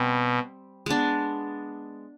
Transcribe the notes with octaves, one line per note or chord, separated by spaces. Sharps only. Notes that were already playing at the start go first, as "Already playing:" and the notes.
Already playing: B2 G3 C4 G4
G#3 B3 D4